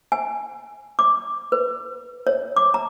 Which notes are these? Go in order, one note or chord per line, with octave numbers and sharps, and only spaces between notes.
G#5
D6
B4
C#5
D6
A#5